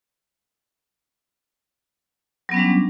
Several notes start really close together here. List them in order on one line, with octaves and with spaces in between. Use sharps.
F#3 B3 C#4 G3 D4